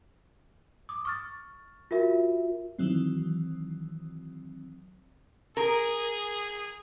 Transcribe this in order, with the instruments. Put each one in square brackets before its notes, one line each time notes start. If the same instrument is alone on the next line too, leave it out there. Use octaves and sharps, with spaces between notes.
[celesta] D6 D#6
C#6 F6 A6
F4 F#4 A#4 E5
[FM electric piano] D#3 E3 F#3 C4
[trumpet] G#4 [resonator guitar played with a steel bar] A#4